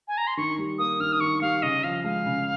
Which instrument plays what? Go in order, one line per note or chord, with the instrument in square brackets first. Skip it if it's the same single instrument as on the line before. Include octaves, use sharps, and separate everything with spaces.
[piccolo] G#5
A#5
C6
[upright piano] D#3 [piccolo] C#6
[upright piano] G3
[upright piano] A#3 [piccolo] D#6
[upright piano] D#3 [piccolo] F6
[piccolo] D#6
[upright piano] D#3 [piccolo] C#6
[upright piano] G3 [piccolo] F5
[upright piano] C#3 [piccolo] D#5
[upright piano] F3 [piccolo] F5
[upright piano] G#3 [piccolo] F5
[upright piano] C#3